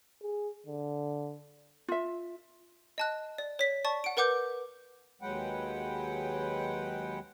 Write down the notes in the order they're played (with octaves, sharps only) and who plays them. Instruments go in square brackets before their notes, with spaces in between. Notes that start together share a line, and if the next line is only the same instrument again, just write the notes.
[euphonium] G#4
D3
[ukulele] F4 E5
[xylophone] D#5 A5 F#6
D5
C#5 B6
D5 A5 C#6
F#5 D7
A#4 B4 F#5 D6 G6
[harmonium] D#2 F#3 G#3 B4 F#5 G5